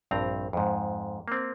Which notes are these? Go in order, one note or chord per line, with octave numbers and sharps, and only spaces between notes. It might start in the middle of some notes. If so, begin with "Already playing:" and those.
A#1 G2 C4 A#5
F2 G#2
A#3 C4